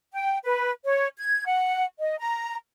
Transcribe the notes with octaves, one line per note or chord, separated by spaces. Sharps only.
G5
B4
C#5
G#6
F#5
D#5
A#5